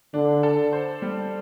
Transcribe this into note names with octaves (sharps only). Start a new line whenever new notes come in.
D3 D4
A4
C5
G3